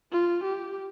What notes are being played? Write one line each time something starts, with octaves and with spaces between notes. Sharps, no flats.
F4
G4